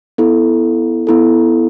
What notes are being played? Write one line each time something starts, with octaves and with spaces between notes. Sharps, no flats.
B3 E4 A4
B3 E4 A4